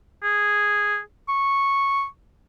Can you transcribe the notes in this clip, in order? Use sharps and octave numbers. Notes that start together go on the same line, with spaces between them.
G#4
C#6